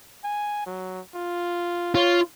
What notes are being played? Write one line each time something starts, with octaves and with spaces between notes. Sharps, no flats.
G#5
F#3
F4
F4 C#5